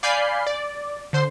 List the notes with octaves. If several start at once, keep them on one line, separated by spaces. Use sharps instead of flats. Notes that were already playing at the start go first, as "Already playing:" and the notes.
D5 F5 G#5 B5 G6 C7
D5
D3 C5 C6